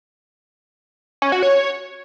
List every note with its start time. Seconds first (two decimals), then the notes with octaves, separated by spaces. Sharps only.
1.22 C#4
1.32 F#4
1.42 C#5